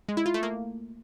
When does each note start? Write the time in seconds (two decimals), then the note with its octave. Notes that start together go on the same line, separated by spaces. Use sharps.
0.09 G#3
0.17 E4
0.26 F4
0.34 A3
0.43 A#3